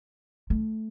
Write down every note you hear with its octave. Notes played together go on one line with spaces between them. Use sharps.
A3